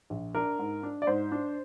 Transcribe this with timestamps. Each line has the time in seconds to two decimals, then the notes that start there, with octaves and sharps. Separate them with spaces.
0.10 A#1
0.34 D4 A#4
0.59 G#2
0.83 D4
1.02 D5
1.07 G#2 C5
1.32 D4